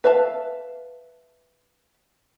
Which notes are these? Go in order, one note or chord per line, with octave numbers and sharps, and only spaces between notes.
B4 E5 F5 A5